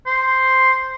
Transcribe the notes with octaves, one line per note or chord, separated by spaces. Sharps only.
C5